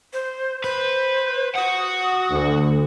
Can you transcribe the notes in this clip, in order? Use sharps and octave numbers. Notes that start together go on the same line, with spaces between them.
C5
B4 C5
F#4 F#5 D#6
D2